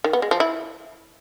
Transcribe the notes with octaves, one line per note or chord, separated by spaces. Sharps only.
D#3
B3
G#3
F3
E4